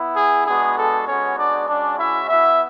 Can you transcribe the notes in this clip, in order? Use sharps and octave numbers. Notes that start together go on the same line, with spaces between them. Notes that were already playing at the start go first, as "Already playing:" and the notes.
Already playing: B3 E4
G#4
G#3 B3 D4 F#4 G#4
A4
G#3 B3 C#4 F#4 C#5
D4 D5
G#3 C#4 D4 F#4 D5
E4 E5
B3 E4 F#4 E5